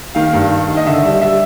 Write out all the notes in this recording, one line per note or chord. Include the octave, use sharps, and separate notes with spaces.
D#3 F5
G2
D#3
D#3
D#5
D3 E5
G3
G3 E5